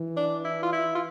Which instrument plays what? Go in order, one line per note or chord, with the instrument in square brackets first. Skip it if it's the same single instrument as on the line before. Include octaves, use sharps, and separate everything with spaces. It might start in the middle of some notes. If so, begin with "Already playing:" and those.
Already playing: [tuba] E3
[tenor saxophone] D4
E4
F4
E4
F4